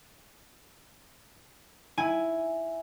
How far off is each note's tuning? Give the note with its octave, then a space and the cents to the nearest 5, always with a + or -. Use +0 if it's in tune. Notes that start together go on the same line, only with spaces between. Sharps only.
E4 +0 G#5 +0